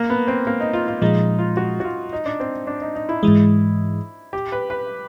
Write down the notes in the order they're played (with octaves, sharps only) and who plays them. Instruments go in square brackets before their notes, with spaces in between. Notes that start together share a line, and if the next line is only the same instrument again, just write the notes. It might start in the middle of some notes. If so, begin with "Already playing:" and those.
Already playing: [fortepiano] A#3
B3
C4
A#3
D#4
F4
F4
[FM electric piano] A#2 F3 G#3 [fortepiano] D#4
[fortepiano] F4
F#4
F#4
F4
D#4
D4
C4
D4
D#4
D#4
E4
[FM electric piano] G#2 E3 G#3
[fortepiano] G4
B4
B4